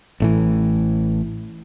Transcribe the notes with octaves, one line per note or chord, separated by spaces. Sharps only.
A1 A2 E3